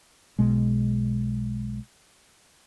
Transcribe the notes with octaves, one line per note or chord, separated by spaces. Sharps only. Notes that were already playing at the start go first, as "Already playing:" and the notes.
B1 B2 G#3